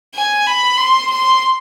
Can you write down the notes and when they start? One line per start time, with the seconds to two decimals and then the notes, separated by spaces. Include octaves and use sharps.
0.14 G#5
0.47 B5
0.78 C6
1.10 C6